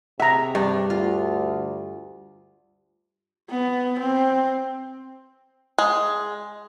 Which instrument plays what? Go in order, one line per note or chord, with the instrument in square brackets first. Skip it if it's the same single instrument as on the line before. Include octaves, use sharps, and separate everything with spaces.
[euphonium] C3 [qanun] G#4 C#5 [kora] E5 [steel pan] F#5 A#5
[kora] G2 [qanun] D4
[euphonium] D2 [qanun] F4
[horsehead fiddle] B3
C4
[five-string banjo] G#3